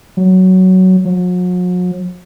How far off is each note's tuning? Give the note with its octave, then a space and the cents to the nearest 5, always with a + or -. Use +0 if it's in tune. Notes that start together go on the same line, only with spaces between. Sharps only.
F#3 +10
F#3 -45